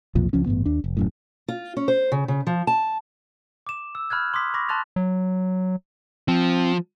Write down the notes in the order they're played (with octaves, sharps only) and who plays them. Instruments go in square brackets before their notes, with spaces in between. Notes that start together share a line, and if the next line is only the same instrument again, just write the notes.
[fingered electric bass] B1 F2 A#2 F3
C#2 F3 C#4
A1 G2 C3 B3
D#2 D4
F1
D#1 F#2 A2
[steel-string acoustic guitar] F4
C#4
C5
C#3
C#3
F3
A5
[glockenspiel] D6 E7
E6
B5 F6 F#6 G#6
C6 D6 D#6 B6
B5 C#6 D6 A#6
A5 C6 F#6 A6 F7
[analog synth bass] F#3
[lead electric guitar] F3 [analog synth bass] C4